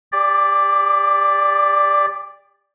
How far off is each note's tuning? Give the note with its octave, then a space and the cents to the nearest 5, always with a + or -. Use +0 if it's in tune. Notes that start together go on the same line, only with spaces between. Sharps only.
G4 +40 D5 +0